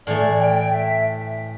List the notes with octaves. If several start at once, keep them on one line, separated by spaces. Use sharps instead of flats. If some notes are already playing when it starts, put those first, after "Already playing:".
A2 E3 A3 D5
G5
E5